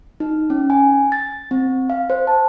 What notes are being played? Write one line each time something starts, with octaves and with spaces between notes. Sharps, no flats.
D#4
C#4
G#5
A6
C4
F5
C5
A5